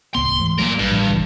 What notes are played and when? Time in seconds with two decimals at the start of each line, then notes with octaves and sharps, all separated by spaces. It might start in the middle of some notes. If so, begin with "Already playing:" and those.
0.15 D1 C#2 B3 C6
0.40 G#2 E3 A3
0.59 A#2 F#3 A#3 A#4
0.79 A#1 G2
0.91 A1 A2 F3
1.10 G1 C#2 E3